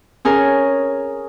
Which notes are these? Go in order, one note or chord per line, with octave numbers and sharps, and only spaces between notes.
C#4 G#4 A#4